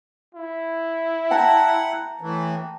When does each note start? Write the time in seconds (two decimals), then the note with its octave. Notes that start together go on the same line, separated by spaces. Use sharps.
0.35 E4
1.31 F#5 G5 A5 A#5
2.21 A2 E3